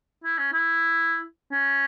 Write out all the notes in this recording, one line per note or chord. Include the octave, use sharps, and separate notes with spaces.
E4
C#4
E4
C#4